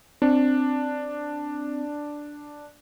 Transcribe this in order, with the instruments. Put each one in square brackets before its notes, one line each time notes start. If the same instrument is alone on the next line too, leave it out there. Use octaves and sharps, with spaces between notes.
[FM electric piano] C4 [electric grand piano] D4